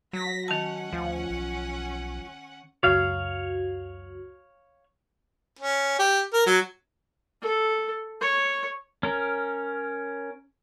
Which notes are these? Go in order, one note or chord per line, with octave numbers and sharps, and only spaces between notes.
F#3 A#6 B6
D#3 C#4 F#5 A5
D2 F3
B1
C#2 F#2 F#4 C#5 F5
C#4
G4
A#4
F#3
A4
C#5
C#4 A#4